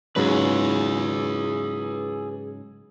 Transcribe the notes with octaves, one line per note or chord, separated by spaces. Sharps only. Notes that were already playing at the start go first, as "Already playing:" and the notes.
G#2 C#3 F#3 G#4 B4